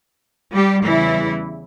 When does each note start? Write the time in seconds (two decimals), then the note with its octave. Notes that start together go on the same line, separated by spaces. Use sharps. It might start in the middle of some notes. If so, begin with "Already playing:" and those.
0.52 G3 G4
0.83 E2 C#3 E3 G3 E4